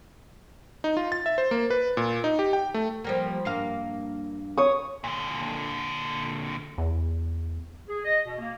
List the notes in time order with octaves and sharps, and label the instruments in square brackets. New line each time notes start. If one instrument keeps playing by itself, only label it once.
[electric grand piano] D#4
F4
A6
E5
C5
A#3
B4
A#2
D#4
G4
G5
A3
[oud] F3 G3 A#3
G2 A#3 F5
[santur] C#5 D#6
[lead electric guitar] A#2 D3
[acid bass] E2
[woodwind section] G#4
D#5
B2
A#3